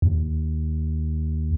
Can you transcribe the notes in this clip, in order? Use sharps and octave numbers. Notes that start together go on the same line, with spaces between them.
D#2